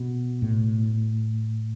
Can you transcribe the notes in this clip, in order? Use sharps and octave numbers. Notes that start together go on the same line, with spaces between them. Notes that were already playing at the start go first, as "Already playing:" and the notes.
Already playing: B2
A2